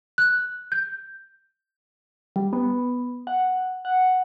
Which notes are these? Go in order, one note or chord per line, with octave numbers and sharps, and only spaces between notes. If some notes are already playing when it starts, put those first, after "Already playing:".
F#6
G6
G3
B3
F#5
F#5